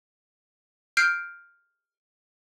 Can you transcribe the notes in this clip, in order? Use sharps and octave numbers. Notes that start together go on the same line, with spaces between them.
F6 G6 C7 D7